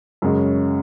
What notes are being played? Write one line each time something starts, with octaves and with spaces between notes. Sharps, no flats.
F#2 C#3 G#3 C#4